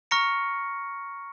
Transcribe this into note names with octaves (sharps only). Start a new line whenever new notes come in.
A#5 C#6 F6 A#6 C#7